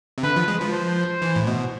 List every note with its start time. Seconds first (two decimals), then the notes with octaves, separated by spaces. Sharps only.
0.18 C3
0.23 D3 B4
0.36 F3
0.48 G#3
0.61 F3
0.73 C5
1.22 E3
1.36 A2
1.47 B2